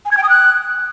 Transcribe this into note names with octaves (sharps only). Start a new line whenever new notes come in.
G#5
G#6
G5
D#6
F#6